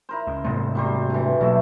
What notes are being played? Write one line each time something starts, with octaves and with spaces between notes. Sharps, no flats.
E4 A#4 C5
C#2
G#2 C3 A3 C5
F#3 G3 C5
D3 E3
B2 F#3 A3 A#3 E5